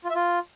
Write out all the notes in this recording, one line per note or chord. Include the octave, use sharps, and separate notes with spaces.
F4
E5
F4